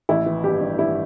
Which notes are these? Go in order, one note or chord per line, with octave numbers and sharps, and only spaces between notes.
A1 E4
E3
G2 G4
G2
G2 E4